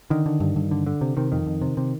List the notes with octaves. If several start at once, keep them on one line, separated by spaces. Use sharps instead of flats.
D3 D#3
D3
G2
G2
D3
D3
C3
C3 D#3
F2 D#3
F2
C3
C3